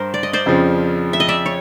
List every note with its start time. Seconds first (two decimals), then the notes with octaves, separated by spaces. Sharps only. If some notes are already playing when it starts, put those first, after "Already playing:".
Already playing: G2 A#4 C5
0.14 D5
0.23 D#5
0.33 C5 D5
0.46 F2 C#3 F3
1.13 E5
1.20 D#5
1.28 D5 E5
1.46 C#5